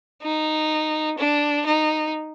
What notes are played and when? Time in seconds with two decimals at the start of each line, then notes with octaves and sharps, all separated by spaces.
0.22 D#4
1.18 D4
1.66 D#4